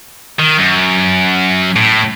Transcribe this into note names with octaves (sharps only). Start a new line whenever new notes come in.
D#3
F#2
A2